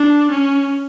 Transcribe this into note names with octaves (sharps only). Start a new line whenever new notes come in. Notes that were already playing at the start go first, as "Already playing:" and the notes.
Already playing: D4
C#4